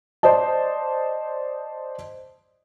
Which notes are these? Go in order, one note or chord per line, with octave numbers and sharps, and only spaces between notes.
C5 D5 D#5 A5